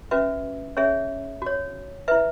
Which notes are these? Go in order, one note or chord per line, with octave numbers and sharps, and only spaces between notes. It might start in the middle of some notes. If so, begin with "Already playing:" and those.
C#4 F#4 B4 E5
C#4 G#4 C#5 E5
F#4 C#5
E4 B4 E5